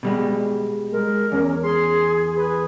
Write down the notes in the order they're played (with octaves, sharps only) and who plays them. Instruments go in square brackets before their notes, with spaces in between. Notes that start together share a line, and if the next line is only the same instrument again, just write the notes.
[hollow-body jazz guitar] B2 G3 G#3
[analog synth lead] G#3 [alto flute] A#4
[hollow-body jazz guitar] E2 [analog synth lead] C#4
[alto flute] G#4 [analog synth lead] C6
[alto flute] G#4 [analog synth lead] B4